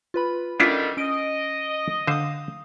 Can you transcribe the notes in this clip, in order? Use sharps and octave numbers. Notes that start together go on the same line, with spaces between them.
F4 B4 B5
D3 D#3 G3 C#4 D4 E4 F4
C#4 D#5 D7
D3 C5 F5 D#6